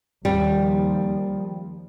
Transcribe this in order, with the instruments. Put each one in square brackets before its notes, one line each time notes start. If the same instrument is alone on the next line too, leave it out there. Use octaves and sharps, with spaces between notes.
[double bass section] D#2 F3 [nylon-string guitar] G3